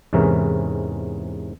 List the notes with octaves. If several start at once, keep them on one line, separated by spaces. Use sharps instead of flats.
E2 G#2 C3 E3 C#4 A#4